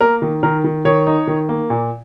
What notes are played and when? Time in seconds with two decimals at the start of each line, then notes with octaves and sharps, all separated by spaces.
0.01 A#3 A#4
0.22 D#3
0.43 D#3 A#4
0.64 D#3
0.85 D#3 C#5
1.07 D#4
1.27 D#3
1.49 A#3
1.70 A#2